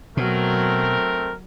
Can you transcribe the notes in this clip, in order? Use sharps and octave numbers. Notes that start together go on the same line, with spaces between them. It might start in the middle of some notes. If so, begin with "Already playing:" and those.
B2 F#3 A3 C4 A#4